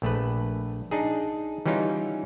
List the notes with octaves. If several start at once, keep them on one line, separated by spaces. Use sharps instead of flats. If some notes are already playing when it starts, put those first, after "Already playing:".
A#1 A3 B4
D4 D#4 G#4
E3 G3 C#4 D#4 F4